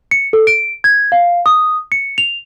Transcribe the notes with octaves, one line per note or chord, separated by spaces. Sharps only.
C#7
A4
D7
G#6
F5
D#6
C#7
F7